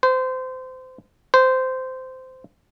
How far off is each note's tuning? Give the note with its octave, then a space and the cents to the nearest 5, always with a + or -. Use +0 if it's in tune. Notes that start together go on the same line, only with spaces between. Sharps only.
C5 -25
C5 -15